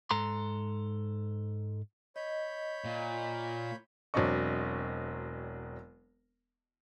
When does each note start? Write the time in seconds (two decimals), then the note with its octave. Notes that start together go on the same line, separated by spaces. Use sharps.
0.11 G#2 A4 A#5 C6
2.16 C#5 D#5 B5 G6
2.85 A#2
4.14 E1 F#3 C4 D4 D#5 C#6